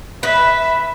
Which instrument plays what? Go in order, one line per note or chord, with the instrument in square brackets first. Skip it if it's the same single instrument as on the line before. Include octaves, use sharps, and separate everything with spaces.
[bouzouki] B4 [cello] E5 [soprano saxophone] B5